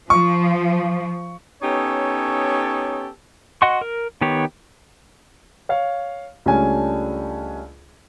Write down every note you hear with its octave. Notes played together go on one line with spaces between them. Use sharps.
F3 C#6
B3 C#4 D#4 G4 A4 C#5
F#4 D#5 F#5 C6 C#6
A#4
D#3 B3 G4 C#5
C#5 F5
C#2 G3 A3 C#4 D4 G#5